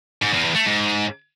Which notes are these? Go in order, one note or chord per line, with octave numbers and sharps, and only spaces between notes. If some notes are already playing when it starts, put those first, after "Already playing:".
G#2
E2
E2
A3
G#2